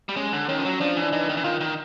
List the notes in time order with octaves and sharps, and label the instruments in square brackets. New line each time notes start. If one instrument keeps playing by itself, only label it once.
[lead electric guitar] G3
[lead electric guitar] G#3 [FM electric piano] C#4
[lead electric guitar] D3
[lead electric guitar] D#3 [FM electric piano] C#4
[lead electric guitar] F3
F#3
[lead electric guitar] F3 [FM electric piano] D4
[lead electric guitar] E3
[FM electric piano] D4
[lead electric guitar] E3 [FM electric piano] D#4
[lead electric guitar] D#3
E3
[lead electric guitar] D#3 [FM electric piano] F4
[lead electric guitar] D#3